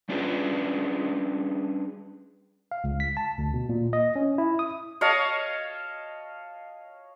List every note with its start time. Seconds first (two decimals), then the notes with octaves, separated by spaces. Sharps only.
0.09 G3 C#4 D4 F4 G#4 B4
2.71 F5
2.84 C#2
3.00 B6
3.17 A5
3.38 D2
3.54 B2
3.69 A#2
3.93 D#5
4.16 C#4
4.38 E4
4.59 D#6
5.01 C#5 D#5 F5 A5